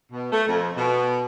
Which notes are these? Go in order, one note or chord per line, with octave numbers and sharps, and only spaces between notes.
B2
A3
F2
B2